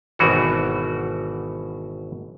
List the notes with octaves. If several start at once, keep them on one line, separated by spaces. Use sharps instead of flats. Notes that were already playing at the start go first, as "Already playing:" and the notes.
G#1 B2 E3 F#4